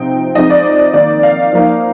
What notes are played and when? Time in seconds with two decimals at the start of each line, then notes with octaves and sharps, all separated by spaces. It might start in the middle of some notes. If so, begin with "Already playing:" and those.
Already playing: C3 F3 C4 D#4 G5
0.35 F3 G#3 C4 D#4 D#5
0.50 D5
0.94 D#3 A#3 D#4 D5
1.23 F5
1.53 F3 A#3 D#4